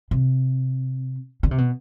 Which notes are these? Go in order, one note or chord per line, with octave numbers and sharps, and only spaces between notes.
C3
D3
C3
B2